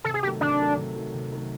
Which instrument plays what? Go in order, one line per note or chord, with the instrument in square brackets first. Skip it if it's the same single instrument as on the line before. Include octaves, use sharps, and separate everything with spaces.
[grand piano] C3 [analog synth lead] A4
[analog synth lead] G#4
[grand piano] D#3 F#3 A3 [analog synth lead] G4
[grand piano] C3 [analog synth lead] D4
[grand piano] D#3 F#3 A3
C3
D#3 F#3 A3
C3
D#3 F#3 A3